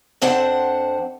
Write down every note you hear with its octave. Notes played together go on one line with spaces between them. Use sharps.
F2 C4 D4 C5 F#5